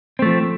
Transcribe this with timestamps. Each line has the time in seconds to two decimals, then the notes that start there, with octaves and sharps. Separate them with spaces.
0.19 C4
0.22 A3
0.25 F3